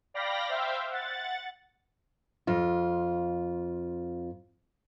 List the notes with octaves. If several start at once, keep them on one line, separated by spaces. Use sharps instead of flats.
D5 F5 G5 B5 A#6
C5 E5 F5 G5
F#5 A6
F2 F4